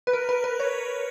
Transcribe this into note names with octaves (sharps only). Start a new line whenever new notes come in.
B4
A#4
B4
B4
C#5